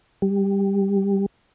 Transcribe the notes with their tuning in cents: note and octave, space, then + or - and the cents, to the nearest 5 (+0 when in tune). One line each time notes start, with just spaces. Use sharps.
G3 +10